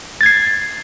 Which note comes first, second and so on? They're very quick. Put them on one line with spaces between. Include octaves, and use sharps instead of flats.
A6 G#6 C7